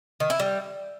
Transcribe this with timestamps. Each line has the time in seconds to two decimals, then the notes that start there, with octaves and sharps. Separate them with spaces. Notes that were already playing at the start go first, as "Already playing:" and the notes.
0.20 D#3
0.30 E4
0.40 G3